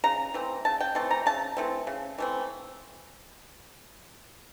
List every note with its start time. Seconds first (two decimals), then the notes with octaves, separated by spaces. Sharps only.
0.04 C#3 A#5
0.34 E3 A3 C4
0.65 C#3 A5
0.81 G5
0.95 E3 A3 C4 A5
1.11 A#5
1.26 C#3 A5
1.57 E3 A3 C4
1.87 C#3
2.18 E3 A3 C4